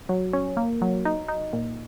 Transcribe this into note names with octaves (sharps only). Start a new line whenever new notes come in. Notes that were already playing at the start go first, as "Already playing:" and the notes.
F#3
C#4
A#3
F#3
D#4
D#4
A#2